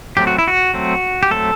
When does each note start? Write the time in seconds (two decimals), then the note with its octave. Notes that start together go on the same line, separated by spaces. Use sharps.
0.17 F#3 A3 C4 G4
0.27 F#4
0.38 E4
0.48 F#4
0.74 F#3 A3 C4
1.23 G4
1.31 F#3 A3 C4 A4